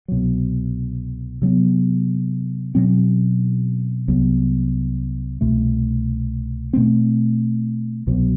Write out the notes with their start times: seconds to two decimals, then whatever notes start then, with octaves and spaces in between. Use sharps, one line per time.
0.08 C2 B2 F#3
1.42 C3 F#3 B3
2.75 B2 F#3 C4
4.08 C2 C3 F#3 B3
5.41 C2 B2 A3
6.73 B2 A3 C4
8.07 C2 B2 F#3